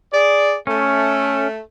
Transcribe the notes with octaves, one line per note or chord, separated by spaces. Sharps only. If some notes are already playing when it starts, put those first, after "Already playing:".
G#4 D5
A3 C#4